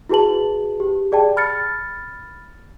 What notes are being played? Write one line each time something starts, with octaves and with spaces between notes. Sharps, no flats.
E4 F#4 G#4 B4 A5 F#7
G4
G#4 D5 G5 A5
B5 F6 A6 C#7